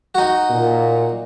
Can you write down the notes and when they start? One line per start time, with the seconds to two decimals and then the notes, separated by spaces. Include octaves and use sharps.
0.15 D#4 F#4
0.50 A#2